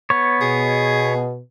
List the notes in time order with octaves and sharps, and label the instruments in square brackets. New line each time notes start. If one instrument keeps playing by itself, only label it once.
[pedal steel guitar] B3 C#5
[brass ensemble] B2 [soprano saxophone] G#4